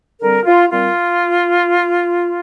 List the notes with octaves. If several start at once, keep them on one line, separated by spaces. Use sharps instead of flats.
D3 G3 C4 A#4
F4
A#2 G3 C4 F4